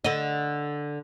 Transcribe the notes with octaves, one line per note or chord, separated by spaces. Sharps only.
D3 D#5